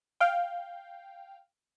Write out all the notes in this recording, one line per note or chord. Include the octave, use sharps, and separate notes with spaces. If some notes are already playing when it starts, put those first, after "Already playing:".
F5 G5